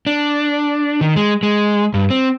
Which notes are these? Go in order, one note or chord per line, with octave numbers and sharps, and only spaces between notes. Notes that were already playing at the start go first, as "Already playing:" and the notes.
D4
D#3
G#3
G#3
G2
C4